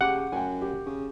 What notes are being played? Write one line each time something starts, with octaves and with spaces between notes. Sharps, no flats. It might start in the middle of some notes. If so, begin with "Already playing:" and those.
C#3 G4 F#5 D6
F#2 G5 G#5
G4
C#3